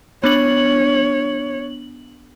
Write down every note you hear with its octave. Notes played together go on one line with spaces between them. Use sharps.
B3 D4 C#5 F#7